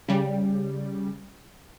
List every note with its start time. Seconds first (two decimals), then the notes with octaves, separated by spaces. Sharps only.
0.08 C#3 G3